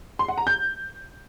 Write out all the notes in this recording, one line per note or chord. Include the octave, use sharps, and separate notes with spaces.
C6
F#5
A#5
G6